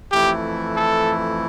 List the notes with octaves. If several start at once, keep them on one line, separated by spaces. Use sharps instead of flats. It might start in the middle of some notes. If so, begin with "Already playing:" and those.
F2 E3 A3 E4 G4
A4